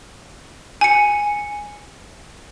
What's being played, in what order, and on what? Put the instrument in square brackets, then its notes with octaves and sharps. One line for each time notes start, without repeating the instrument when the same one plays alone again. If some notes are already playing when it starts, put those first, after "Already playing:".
[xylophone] G#5 C#7